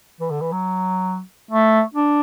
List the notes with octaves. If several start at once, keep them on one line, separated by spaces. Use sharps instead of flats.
E3
D3
E3
F#3
A3
D4